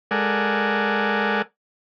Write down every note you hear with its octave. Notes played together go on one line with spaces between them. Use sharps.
G#3 A4 A#4 D5 F#5 G#5